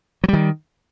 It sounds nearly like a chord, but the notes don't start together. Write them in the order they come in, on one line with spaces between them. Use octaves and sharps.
F#3 G3 D#3